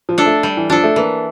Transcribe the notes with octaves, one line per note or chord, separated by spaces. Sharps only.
F3
D4 A4
A3
G3
E3
F3 D4 A4
A3
E3 A#3